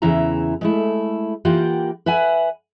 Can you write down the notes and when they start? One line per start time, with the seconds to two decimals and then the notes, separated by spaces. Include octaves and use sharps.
0.02 E2 C#3 E3 E4 E5 A#5
0.61 G#3 A3 E4
1.45 E3 A#3 F4 G4 F#5 G5
2.06 B4 E5 F#5 G#5